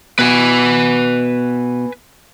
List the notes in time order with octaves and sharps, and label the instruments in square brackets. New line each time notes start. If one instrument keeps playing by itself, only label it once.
[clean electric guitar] B2 [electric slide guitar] B4 G#5